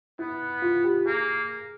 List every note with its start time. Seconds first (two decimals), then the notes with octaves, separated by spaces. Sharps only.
0.19 B3 E4
0.62 F4
0.84 G4
1.06 A#3 G#4